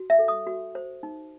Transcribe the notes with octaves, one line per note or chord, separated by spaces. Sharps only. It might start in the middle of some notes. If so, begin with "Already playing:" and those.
Already playing: F#4
E5
A4
D#6
F#4
C5
D#4